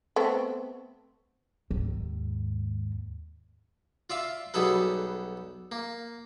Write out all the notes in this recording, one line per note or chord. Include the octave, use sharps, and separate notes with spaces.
A3 B3 C4
D#2 G#2
F4 D5 E5 F5
B1 G3 B3 G#4 A4 B4
A#3